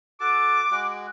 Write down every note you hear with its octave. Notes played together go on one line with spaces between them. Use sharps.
F#4 A4 A5 D6
G#3 F#4